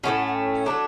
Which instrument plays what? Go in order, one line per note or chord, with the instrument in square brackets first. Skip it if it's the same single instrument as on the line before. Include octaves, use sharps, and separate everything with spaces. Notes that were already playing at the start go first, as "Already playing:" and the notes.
[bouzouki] A2 F3 A3 C#4 [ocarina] F#5
[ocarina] F#5
G5
[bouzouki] F#3 A3 D4 [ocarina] A5 A#5